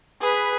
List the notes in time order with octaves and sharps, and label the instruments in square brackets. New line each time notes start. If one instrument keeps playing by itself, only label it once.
[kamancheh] G#4 [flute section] B4